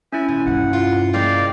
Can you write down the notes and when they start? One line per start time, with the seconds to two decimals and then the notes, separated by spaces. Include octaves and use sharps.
0.13 C#4 E4 E5 G#5
0.28 D#2 A#2 G#5
0.46 G2 C3 F#5
0.73 F4
1.13 F3 G#3 A#3 D5 F5 G5